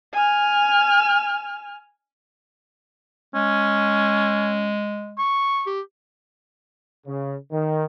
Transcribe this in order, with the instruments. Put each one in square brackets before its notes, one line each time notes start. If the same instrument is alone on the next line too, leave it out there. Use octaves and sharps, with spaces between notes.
[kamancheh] G#5 F6
[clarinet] G#3 [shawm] C#4
[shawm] C#6
[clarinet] G4
[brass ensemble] C#3
D#3